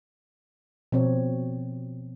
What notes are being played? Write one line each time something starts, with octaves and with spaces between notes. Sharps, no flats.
B2 F3 C4 C#5